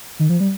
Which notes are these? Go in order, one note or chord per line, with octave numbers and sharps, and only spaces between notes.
D#3
F3
G3